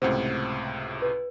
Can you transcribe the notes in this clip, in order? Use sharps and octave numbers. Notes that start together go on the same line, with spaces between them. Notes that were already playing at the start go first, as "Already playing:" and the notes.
C#2 A2 C3 C5 F#5
B4